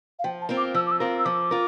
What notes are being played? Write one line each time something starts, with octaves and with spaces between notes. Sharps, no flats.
F5
F3 G5
A5
C4 F4 A#4
D6
F3 E6
D6
E6
C4 F4 A#4
E6
F3 D6
F4 A#4